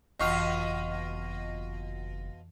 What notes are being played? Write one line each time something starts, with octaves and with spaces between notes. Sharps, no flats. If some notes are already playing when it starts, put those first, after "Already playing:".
F#1 F2 B2 E3 F4 D#5 C#6 F6